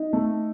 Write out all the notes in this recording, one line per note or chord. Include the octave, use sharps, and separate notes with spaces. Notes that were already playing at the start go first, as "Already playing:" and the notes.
Already playing: D#4
A3